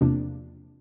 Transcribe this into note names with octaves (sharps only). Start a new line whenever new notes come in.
E2 C3 F3 A#3 D4